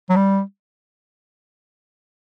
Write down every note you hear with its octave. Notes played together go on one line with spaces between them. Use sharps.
F#3
G3